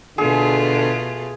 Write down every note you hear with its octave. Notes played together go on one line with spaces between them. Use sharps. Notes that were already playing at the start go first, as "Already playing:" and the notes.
B2 D3 A3 F4 G#4